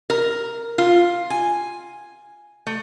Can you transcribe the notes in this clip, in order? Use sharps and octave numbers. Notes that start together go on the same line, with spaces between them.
A#4
F4
G#5
A3